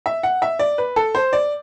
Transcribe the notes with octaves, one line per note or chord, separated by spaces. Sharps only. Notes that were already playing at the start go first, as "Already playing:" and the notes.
E5
F#5
E5
D5
B4
A4
C5
D5